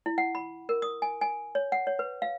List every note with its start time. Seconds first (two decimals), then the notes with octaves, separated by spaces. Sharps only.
0.06 E4
0.18 F#5
0.35 B5
0.69 A#4
0.82 D#6
1.02 G#5
1.21 G#5
1.55 C#5
1.72 F#5
1.87 C#5
1.99 B4
2.22 F5